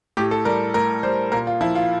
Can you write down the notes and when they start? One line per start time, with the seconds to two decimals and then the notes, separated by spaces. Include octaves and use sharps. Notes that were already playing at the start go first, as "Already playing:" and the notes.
0.17 A2 G4
0.31 A4
0.45 G3 A#4
0.74 A2 A#4
1.03 G3 C5
1.32 A#2 A#4
1.47 F4
1.61 F3 E4
1.75 F4